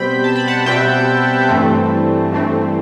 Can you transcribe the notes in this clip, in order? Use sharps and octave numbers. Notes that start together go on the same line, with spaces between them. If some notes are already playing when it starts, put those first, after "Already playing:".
Already playing: B2 G3 C4 G5 B5
A5
B5
F#5 A5
B2 G3 C4 E5 G5
G2 E3 A3 C4
G2 E3 A3 C4